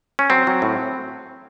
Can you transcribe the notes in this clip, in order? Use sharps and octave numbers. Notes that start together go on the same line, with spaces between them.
C#4
F#3 C4
F#3
A2